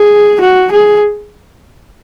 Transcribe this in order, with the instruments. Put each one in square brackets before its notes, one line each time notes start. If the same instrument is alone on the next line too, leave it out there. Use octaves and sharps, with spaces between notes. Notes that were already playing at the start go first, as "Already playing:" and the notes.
Already playing: [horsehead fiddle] G#4
F#4
G#4